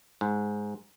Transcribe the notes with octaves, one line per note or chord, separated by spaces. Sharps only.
G#2